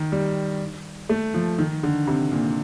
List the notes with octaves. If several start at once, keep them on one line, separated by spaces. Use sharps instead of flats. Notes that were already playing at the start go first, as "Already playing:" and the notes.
Already playing: D#3
G3
A3
F3
D#3
D3
C3
A#2